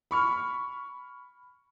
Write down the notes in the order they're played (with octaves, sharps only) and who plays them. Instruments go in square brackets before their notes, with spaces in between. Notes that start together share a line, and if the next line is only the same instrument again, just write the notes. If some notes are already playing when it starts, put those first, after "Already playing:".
[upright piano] B5 C#6 F6